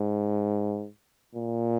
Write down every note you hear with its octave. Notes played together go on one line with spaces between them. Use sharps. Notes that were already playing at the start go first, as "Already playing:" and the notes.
Already playing: G#2
A#2